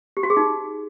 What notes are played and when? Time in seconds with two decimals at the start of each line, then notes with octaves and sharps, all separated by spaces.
0.17 G4
0.23 F#4
0.30 G#4
0.37 D#4